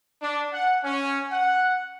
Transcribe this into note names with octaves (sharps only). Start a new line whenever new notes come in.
D4
F#5
C#4
F#5